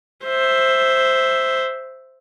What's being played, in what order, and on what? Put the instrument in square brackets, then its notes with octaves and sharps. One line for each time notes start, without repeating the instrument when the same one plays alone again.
[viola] C5 E5